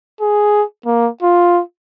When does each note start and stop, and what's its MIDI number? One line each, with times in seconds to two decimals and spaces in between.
0.21 0.63 68
0.86 1.09 58
1.22 1.61 65